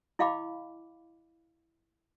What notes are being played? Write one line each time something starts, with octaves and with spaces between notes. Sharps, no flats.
E4 D#5 F5 G5 B5 D6